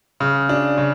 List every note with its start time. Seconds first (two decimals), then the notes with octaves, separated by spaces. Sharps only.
0.20 C#3
0.49 D4
0.78 C#3